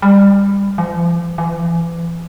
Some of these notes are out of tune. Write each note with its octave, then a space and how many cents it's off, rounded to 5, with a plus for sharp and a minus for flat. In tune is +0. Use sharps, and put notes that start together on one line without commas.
G3 +25
F3 -40
E3 +35